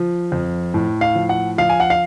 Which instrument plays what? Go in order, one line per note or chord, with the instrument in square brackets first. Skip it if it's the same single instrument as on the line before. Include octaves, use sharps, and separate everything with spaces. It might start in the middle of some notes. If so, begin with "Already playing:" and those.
Already playing: [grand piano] F3
F2
A2
F5
F3
F#5
F3 F5
G#5
F#5
F5